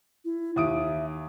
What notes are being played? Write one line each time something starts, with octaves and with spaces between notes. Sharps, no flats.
E4
D#2 E5 D#6 D7